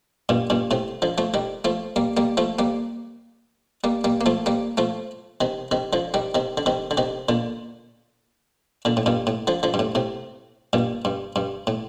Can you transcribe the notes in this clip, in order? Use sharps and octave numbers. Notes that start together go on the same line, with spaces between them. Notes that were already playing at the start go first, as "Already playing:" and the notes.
G2 A#2
G2 A#2
A2 C3
D3 F3
F3 A3
D#3 G3
F3 A3
G3 A#3
G3 A#3
F3 A3
G3 A#3
G3 A#3
G3 A#3
A#3
F3 A3
G3 A#3
F3 A3
C3 D#3
C3 D#3
D3 F3
D#3 G3
C3 D#3
D3
C3 D#3
D3
C3 D#3
A#2 D3
A#2 D3
A2
G2 A#2
A2
D3 F3
D3 F3
G2
A2
A2 C3
G2 A#2
G2
G2
A2